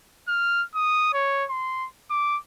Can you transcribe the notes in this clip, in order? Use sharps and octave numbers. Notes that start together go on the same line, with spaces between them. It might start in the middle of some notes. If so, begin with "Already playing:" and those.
F6
D#6
C#5
C6
D6